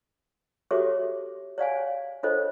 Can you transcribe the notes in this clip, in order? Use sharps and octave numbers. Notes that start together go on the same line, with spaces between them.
F#4 G4 A4 C#5 E5 D6
C#5 D5 F5 G#5
D4 F4 A4 C5 C#5 D#5